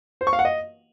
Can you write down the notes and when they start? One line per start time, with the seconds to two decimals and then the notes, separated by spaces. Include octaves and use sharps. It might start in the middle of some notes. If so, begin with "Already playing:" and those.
0.21 C5
0.27 C#6
0.33 F5
0.39 F#5
0.45 D#5